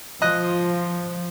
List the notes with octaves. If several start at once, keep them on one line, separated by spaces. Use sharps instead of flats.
F3 D#5 F#6